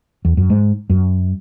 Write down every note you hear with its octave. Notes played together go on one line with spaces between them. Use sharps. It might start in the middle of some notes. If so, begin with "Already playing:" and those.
E2
F#2
G#2
F#2